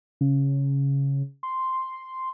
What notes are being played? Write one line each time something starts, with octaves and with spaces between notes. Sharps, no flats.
C#3
C6